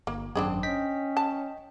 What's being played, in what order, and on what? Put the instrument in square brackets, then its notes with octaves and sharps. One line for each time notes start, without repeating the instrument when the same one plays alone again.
[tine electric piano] G1 [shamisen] A#3
[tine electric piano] G#1 F#2 [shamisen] C4 D4 G#4
[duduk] C#4 [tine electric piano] D#5 G5 B6
[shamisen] A5